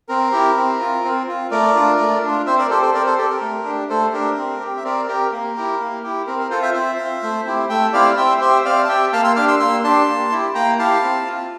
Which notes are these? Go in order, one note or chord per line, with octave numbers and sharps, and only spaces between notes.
C4 A#4
E4 G4
C4
F4
C4
F4
A3 A#4 D5
D4 F4
A3
D4 F4
C4 C5 E5
A#4 D5
G4 A4 C5
A4 C5
C4 A#4 D5
A4 C5
G4 A4
A#4
A3
D4 G4
A3 A4 C5
D4 G4 A#4
C4
G4
E5
C4 A#4 D5
G4 A#4
A#3 A#4
E4 G4
A#3
E4 G4
C4 A#4
A#4
F4 A4 C5
C5 E5
C4 C5 E5
F4
A3
C4 E4 G4
A3 E5 G5
C4 E4 G4 D5 F5
C4 E5 G5
G4 C5 E5
C4 D5 F5
A5
G4 E5 G5
A#3 F5 A5
C6 E6
D4 G4 D6 F6
C6 E6
A#3 C6 E6
D4 G4 A5 C6
A#3
E4 G4
A#3 G5 A#5
E4 G4 F5 A5
C4
F4